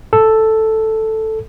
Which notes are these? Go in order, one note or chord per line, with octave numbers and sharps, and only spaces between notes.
A4